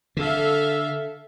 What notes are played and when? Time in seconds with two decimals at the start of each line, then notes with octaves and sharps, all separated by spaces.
0.17 D3 A4 E5 F5